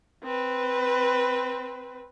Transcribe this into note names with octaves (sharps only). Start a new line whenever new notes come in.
C4 B4